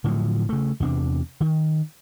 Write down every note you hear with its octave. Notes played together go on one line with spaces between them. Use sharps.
A2 D3 F3 F#3
C#3 A3
E2 C3 B3 D4
D#3